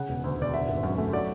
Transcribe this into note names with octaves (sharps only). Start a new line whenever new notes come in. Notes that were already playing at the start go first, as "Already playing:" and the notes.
Already playing: C#3 F#5
E1
D2
E1 D5
D3 E5
G#1
F#2
A3
F#3 D5